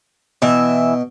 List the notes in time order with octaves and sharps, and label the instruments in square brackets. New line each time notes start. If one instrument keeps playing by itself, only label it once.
[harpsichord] B2 [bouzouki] E3 E5